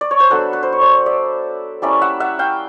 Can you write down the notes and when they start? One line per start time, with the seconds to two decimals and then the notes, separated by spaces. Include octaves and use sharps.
0.01 D5
0.11 C#5
0.20 C5
0.30 F#3 B3 D4 A4 B4
0.53 B4
0.63 C5
0.73 C#5
0.81 C5 D5
1.06 D5 E5
1.82 G3 A#3 C#4 E4 D5 E5
2.02 E5 F#5
2.20 E5 F#5
2.39 F5 G5